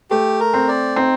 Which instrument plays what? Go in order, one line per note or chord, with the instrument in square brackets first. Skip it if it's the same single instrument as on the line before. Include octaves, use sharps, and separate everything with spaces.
[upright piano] A3 [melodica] G4
[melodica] A#4
[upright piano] C4
[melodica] D5
[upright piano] C4 [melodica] D#4